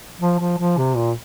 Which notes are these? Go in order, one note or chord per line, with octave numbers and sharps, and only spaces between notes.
F3
F3
F3
C3
A#2